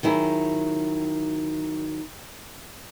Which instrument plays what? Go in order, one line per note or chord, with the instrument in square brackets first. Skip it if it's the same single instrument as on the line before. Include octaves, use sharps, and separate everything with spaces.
[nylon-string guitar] D#3 F#3 E4 G#4